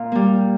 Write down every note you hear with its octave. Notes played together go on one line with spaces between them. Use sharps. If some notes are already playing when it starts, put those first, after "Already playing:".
Already playing: A#2 F5
G3 A#3